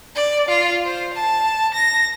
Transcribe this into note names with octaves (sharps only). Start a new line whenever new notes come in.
D5
F4
C5
A5
A#6